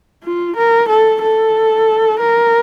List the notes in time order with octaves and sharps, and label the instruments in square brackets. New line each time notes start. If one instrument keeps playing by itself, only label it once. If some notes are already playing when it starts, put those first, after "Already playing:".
[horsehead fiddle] F4
A#4
A4
A4
A#4